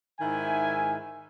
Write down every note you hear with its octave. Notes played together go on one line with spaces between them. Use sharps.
G#2 D#3 E4 E5 G#5